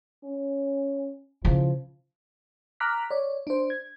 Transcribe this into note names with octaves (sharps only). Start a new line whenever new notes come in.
C#4
C#3 F3 E4
A#5 D6 F6 F#6 B6
C#5 D5
D4 C5
G#6